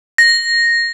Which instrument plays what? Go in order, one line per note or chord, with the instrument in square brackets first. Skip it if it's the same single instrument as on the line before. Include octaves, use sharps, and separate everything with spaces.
[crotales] A#6